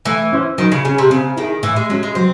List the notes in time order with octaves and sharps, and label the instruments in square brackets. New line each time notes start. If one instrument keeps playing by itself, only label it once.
[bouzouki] E3 [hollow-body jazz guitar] A3
[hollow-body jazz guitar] C#4 E4 C5
[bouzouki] D#3 [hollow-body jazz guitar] F#3
[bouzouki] C#3
[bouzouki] C#3 [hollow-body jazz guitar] G#4
[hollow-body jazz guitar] C#4
[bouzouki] C3
[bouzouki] C#3 [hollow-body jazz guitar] C4
[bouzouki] D#3 [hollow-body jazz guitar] E4 G#4
[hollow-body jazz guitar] A2 [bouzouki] E3
[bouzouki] G#3
[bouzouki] F#3 [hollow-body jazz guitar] G#3 C#4
[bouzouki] G#3
[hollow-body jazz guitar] F#3 [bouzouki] C4